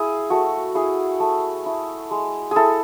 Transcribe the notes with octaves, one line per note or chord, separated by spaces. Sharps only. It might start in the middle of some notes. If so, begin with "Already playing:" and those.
Already playing: E4 G#4
A3 F#4
E4 G#4
A3
E4
G#3
E4 G#4 A4